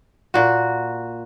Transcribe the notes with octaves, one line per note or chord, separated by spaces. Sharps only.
A#2 F#4